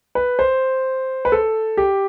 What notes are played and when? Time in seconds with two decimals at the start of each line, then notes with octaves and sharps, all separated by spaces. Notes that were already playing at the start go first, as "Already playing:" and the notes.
0.15 B4
0.39 C5
1.25 B4
1.32 A4
1.77 G4